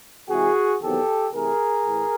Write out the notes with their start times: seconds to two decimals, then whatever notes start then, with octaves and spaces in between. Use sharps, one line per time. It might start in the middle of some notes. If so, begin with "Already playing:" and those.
0.29 C3 E3 G#3 C4 F#4 G#4
0.81 E2 C3 D#3 F#3 B3 G4 A4
1.33 C3 E3 A3 C4 G#4 A#4
1.86 A2 E3